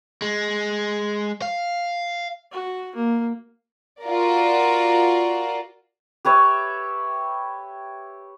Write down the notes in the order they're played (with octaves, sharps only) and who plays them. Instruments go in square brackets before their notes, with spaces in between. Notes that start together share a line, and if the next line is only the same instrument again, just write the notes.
[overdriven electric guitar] G#3
F5
[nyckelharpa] F#4
A#3
[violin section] F4 F#4 A#4 D5
[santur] G4 B4 C#5 E5